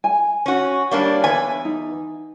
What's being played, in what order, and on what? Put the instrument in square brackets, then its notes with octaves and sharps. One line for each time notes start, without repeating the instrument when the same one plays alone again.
[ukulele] G#5
[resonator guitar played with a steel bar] C#4 F#4
[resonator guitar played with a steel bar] G3 A#3 D4 [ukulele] C#5
[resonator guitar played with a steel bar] E2 B4 G#5
[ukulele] D#4